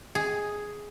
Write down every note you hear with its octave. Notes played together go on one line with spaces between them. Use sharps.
G#4